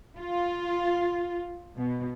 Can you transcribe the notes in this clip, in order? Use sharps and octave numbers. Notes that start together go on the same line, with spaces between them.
F4
B2